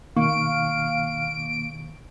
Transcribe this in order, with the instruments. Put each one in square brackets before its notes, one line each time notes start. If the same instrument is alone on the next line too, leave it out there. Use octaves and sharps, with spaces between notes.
[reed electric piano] B2 D#3 C#6 [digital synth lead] A#3 [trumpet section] F5 [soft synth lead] D7